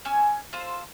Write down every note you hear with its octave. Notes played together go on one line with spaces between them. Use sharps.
C#4 G#5 E6
F4 A4 C5